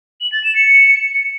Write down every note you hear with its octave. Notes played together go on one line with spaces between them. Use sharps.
F#7
A6
E7
C#7